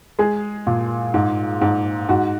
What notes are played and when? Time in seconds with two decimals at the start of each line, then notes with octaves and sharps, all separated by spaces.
0.19 G#3 G#4
0.67 A#2
1.14 G#2
1.61 G#2
2.09 G#2 F#4